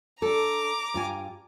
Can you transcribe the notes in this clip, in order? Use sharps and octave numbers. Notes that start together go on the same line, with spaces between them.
D4 A4 A#5 D6
G2 F4 G#5